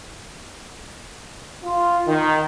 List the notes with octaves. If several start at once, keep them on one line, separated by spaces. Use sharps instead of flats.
F4
D#3